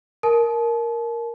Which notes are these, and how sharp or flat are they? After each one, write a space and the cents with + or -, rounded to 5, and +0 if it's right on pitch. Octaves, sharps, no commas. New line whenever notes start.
A#4 +0 A5 -35